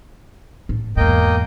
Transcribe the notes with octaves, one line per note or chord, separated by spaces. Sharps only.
A2
E2 G#2 A#3 D#5 G5